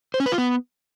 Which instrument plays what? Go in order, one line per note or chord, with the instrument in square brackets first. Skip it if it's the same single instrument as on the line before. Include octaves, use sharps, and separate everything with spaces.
[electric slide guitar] C5
C#4
B4
F4
B3